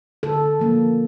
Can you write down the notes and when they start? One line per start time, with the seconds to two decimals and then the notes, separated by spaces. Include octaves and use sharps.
0.23 D3 A4
0.60 F3 A#3 C#4